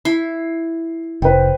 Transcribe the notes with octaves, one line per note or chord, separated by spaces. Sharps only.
E4 C7
F1 B4 C5 G5